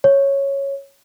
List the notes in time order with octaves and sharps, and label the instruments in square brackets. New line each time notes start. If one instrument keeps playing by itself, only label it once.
[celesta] C#5